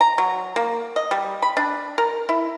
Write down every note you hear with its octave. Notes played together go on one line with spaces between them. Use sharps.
A#5
F#3
A#3
D#5
G3
B5
D4
A#4
E4